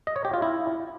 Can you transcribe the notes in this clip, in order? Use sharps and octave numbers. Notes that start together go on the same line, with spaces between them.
D#5
C#5
G4
F4
E4